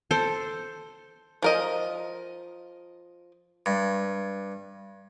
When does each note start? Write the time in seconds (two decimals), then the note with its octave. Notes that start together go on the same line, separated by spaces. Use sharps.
0.11 A4 C5
1.42 F3 A#4 D#5
3.66 G2